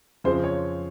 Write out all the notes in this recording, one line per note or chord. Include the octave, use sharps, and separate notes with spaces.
F2 C#3 F3 G#3 C5
C#5